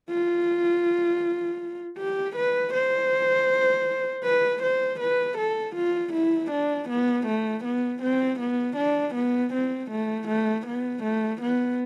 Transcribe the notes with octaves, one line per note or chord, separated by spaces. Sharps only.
F4
G4
B4
C5
B4
C5
B4
A4
F4
E4
D4
B3
A3
B3
C4
B3
D4
B3
C4
A3
A3
B3
A3
B3